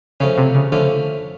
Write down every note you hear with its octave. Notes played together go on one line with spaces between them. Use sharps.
C#3 F3 A3 C#4
C3
C#3
D3 F3 A3 C#4